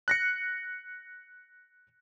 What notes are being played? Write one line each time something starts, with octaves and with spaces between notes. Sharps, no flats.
F#6 A#6 C#7